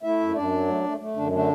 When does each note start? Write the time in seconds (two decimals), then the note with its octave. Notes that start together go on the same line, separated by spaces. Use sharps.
0.03 A3 E4 E5
0.20 F#2
0.36 F#2 D4 D5
0.52 F#3
0.68 A3
0.84 A3
1.00 A3
1.16 F#2 D3 D4
1.32 D3 A3 D4